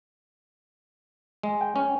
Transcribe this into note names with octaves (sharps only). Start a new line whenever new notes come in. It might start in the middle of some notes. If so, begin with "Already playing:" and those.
G#3
G5
C#4